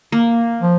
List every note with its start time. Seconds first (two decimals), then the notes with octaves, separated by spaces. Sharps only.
0.12 A#3
0.62 F3